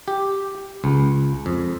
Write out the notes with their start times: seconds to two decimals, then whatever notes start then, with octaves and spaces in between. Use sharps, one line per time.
0.08 G4
0.84 C#2
1.46 F2